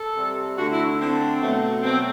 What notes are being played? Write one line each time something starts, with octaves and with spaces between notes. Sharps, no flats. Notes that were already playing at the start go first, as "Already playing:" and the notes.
Already playing: A4
C3 G3
D3 A3 F#4
E4
D3 A3 C4
B2 F#3 A3
B2 F#3 A3 C4